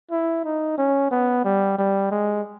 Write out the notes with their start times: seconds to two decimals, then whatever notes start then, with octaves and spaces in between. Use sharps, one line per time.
0.11 E4
0.45 D#4
0.78 C#4
1.11 B3
1.45 G3
1.78 G3
2.11 G#3